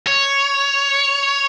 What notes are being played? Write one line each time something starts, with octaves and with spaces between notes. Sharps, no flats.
C#5